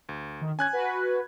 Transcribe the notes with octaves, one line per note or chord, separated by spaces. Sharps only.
D2
D#3
C#4 G#5 F#6 G#6
F#4 B4